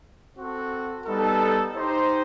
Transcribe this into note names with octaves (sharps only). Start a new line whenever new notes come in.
C4 F#4 A4
G3 B3 D#4 A4
D#4 G4 C5